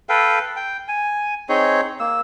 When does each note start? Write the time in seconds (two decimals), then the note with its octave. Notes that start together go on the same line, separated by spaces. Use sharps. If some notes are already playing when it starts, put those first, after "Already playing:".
0.09 A4 B4 F5 G5
0.56 G5
0.88 G#5
1.49 C4 D#4 G#4 C#5
2.00 A#3 E6